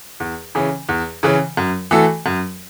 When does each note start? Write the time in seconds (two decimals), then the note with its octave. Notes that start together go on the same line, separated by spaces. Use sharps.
0.20 E2
0.55 C#3 E3 C#4
0.89 E2
1.23 C#3 E3 C#4
1.57 F#2
1.91 E3 A3 F#4 A4
2.26 F#2